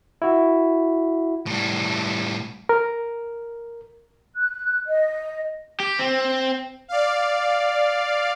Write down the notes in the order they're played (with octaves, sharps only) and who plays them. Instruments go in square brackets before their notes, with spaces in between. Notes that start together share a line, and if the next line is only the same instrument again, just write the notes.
[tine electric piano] E4 F#4
[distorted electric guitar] A2 G3
[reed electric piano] A#4
[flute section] F#6
D#5
[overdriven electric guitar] G4
C4
[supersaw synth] D5 F5